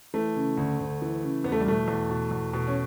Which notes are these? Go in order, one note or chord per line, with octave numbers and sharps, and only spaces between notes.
E3 A3
C#3
D2
D2
E3
C#3
E2 B3
A3
G3
B2 A3
E2
B2
E2
B2
C#4